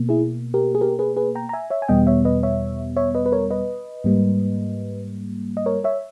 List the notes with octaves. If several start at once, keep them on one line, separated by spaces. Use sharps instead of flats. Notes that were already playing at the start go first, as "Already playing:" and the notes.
Already playing: B2 A#3
E4 G#4
G4 A#4
G#4
G4 A#4
G#4 B4
G#4 B4
G5 A#5
A#5
E5 G#5
C#5 E5
G#5
E2 B2 G3 B3 D#5 G5
C#5 E5
B4 D#5
C#5 E5
C#5 E5
B4 D#5
B4
A#4 C#5
B4 D#5
G#2 G3 A#3
D#5
A#4 C#5
C#5 E5